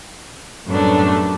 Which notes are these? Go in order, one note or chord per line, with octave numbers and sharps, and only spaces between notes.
F#2 A2 G3 A3 B3 D4